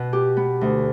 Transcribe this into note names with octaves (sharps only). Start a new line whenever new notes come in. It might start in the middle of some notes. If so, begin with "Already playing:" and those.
Already playing: B2
G4
B3
D2